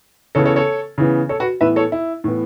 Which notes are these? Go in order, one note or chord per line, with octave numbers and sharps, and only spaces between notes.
C#3 E3 B3 A4 C#5
A4 C#5
A4 C#5
C#3 E3 B3
A4 C#5
F#4 B4
A2 E3 B3 B4 E5
A4 C#5
E4
A2 E3 B3